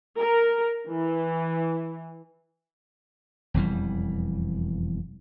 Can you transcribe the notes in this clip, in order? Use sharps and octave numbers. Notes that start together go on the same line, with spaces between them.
A#4
E3
E1 F2 E3 G3